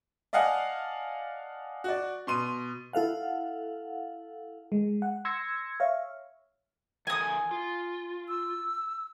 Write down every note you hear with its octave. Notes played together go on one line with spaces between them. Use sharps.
D5 D#5 F5 F#5 G#5 A5
F#4 D5
B2 C6 D#7
E4 A4 F5 F#5
G#3
F#5
C6 E6 G#6 A#6 C#7
C#5 E5 F5
E3 A4 A#4 G#5 D#6
F4
E6